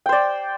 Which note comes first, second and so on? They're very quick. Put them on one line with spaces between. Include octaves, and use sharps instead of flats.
G5 C5 D5